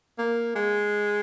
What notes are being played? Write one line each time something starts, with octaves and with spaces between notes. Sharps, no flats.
A#3
G#3